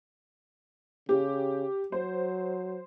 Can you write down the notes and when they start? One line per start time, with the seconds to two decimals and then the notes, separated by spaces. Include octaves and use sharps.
1.09 C#3 G4
1.92 F#3 C5